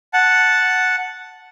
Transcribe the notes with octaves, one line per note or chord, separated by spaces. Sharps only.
F#5 A5